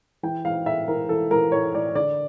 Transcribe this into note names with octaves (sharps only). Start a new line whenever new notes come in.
E3 G5
E3 F5
A2 E5
E3 A#4
E3 A4
E3 A#4
A2 C#5
A2 D5
D3 D5